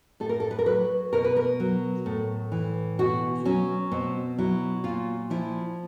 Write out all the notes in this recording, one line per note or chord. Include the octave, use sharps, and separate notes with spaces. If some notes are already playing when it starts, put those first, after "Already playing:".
A2 A4
A#4
A4
B4
A#4
F#3 B4
B2 A#4
B4
A#4
F#3
A2
E3
B2 F#4
F#3 C#4
B2 C4
F#3 E4
A#2 F4
F3 E4